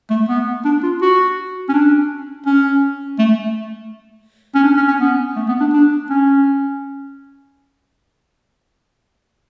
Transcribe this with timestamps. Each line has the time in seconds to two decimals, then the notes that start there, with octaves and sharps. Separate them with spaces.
0.10 A3
0.29 B3
0.65 D4
0.83 F4
1.02 F#4
1.69 C#4
1.74 D4
2.46 C#4
3.19 A3
4.55 C#4
4.64 D4
4.77 C#4
4.88 C#4
5.01 B3
5.36 A3
5.49 B3
5.61 D4
5.73 D4
6.10 C#4